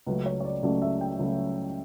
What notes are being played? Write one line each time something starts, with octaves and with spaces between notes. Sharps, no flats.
C#2 C#3 F#3 A3 B4
C#5
C#5
D5
C#2 C#3 F#3 A3 D5
E5
G5
C#2 C#3 F#3 A3